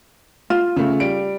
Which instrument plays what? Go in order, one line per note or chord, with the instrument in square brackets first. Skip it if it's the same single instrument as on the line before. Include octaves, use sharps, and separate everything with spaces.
[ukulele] F4
[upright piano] C#3 A3
G3 D7